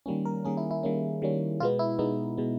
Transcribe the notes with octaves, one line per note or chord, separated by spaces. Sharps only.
D#3 G3 A#3 C#4
A#4
D#3 G3 A#3 C#4 G#4
E4
E4
D#3 G3 A#3 C#4
D#3 G3 A#3 C#4
B2 G#3 B3 F4
E4
B2 G#3 B3 D#4
B2 G#3 B3